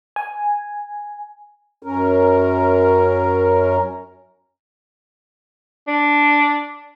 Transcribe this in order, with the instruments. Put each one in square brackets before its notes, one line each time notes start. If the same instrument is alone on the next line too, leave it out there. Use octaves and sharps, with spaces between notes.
[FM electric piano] G#5
[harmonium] F#2 C#4 A#4
[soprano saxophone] D4